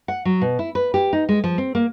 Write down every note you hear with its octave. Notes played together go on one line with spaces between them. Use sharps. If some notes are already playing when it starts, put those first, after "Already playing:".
F#5
F#3
B2
E4
B4
G4
D#4
G#3
F3
C4
A#3